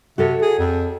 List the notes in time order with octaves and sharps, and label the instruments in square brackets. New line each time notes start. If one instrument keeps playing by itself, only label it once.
[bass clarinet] C3 [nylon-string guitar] F#4 A4 C#5
[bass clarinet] G#4
F2